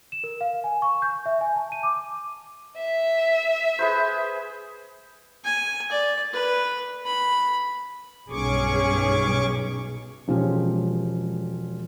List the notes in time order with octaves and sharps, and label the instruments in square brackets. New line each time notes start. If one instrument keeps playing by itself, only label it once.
[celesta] E7
A#4
F5
G#5
C#6
G6
E5
G#5
A5
D#7
D6
[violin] E5
[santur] G#4 B4 C5
[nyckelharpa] G#5
D5
B4
B5
[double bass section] B1 [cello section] G2 G#4 [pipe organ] C#4 C#6 D6
[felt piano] E1 F3 G#3 C#4 G4